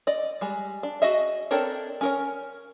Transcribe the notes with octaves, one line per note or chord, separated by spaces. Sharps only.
D5 D#5
G3 G#3
D4
F#4 G#4 D#5 E5
C4 D4 A4 A#4 C#5
C#4 A#4 C#5